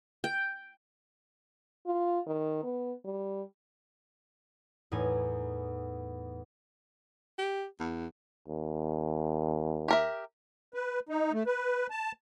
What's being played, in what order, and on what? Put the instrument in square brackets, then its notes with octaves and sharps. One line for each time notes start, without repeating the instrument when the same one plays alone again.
[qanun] G5
[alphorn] F4
D#3
B3
G3
[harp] E2 A2 D#4 G#5
[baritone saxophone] G4
E2
[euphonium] D#2
[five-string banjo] G4 A#4 E5
[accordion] B4
D#4
A3
B4
A5